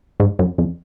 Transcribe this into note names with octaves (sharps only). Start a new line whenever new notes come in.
G#2
F#2
F2